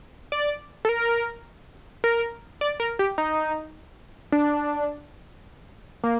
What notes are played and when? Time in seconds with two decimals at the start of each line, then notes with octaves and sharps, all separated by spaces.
0.32 D5
0.85 A4
0.89 A#4
2.04 A#4
2.61 D5
2.80 A#4
2.99 G4
3.18 D#4
4.32 D4
6.04 A#3